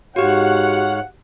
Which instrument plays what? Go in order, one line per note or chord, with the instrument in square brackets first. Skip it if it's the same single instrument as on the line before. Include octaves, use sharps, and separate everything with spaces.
[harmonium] G#2 C#5 F5 [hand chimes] F#4 G4 [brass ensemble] F#5